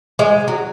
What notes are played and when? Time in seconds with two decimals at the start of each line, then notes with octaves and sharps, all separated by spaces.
0.19 G#3
0.48 F#3